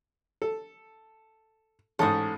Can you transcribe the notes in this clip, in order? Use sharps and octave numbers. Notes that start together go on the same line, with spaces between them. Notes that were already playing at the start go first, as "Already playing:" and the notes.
A4
A1 G#2 A4 D#6